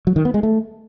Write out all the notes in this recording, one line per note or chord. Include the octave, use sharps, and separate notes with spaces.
F#3
D#3
B3
G#3
A3